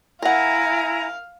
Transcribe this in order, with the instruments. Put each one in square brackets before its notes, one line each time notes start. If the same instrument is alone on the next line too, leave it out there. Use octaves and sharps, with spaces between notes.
[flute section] E4 G#5 A#5 [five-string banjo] A#4 F#5 [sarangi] F5